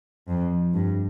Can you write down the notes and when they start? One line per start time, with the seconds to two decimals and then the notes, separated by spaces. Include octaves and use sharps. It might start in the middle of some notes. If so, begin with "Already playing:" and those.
0.28 F2
0.74 G2